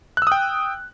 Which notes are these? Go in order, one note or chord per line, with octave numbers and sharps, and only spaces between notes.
G5 D#6 E6 F#6